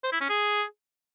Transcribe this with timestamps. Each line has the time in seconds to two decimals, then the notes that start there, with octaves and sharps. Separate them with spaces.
0.04 C5
0.12 E4
0.21 C#4
0.29 G#4